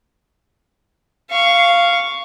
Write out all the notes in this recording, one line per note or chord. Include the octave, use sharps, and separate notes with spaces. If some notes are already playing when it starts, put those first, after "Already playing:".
F5 C#6